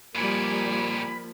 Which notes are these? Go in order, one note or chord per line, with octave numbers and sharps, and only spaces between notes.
F2 A#2 F3 G3 A#3 G#5 B5